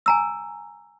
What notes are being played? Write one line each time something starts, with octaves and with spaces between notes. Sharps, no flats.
G#5 A#5 E6